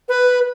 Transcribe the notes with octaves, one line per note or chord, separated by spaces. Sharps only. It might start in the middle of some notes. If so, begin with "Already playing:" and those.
B4